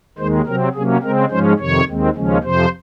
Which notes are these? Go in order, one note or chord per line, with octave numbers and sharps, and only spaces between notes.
D#2 D#3 G#3 C5
C3 F#3 C4 A#4
C3 F#3 A#3 C#4 G#4
C#3 G#3 C4 A#4
G#2 F3 G#3 C#4 C5
F2 C3 D#3 C#5
D#2 D#3 G#3 C4
D#2 C#3 F3 G#3 C#4
F2 C3 F3 C5